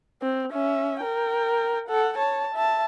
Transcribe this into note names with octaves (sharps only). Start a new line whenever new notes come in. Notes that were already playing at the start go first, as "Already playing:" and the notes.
C4
C#4 E5
A#4 G5
A4 F#5
C#5 A5
E5 A5